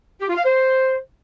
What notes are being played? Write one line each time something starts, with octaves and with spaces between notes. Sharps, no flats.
G4
F4
F5
C5